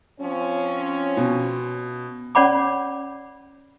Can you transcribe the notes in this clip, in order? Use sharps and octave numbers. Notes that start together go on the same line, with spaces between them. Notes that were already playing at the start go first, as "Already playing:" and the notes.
F3 C4 C#4
B2
C#4 C#5 D5 F#5 B5 D6